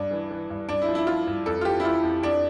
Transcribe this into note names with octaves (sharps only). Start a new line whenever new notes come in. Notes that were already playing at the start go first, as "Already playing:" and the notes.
Already playing: G2 D4
E3
E3
G2
G2 D4
E4
F3
E4
F3 F4
G2
F2 A4
F4
E3 G4
E4
E3 F4
F2
F2 D4